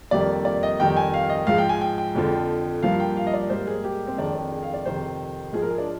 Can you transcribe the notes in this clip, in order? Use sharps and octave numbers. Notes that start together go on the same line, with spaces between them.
F2 D#3 G3 A#3 D5
D5
D#5
F2 D#3 G3 G5
G#5
F5
D#5
G#2 F3 G#3 F5
G5
G#5
G5
G5
F2 D3 F3
G2 F3 A#3 F5
G5
F5
D#5
D5
G#2 G3 A#3 C5
G#4
G4
C4
F2 D#3 G#3 D4
D4
G#4
F5
D5
F2 C3 D#3 C5
G#2 F3 G#3 G#4
A#4
G#4
D4